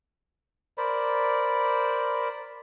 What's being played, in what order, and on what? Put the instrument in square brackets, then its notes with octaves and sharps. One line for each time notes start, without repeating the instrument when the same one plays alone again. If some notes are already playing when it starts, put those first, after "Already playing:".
[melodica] A#4 C5 D5 B5